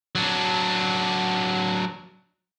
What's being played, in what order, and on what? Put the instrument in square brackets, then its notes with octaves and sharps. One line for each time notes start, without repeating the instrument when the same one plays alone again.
[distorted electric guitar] F#3 D4